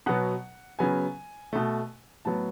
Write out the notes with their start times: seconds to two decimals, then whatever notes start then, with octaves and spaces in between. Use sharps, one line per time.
0.06 B2 F#3 B3 F#5
0.79 C#3 F#3 B3 G#5
1.53 B2 A3
2.25 A2 F#3 B3 A5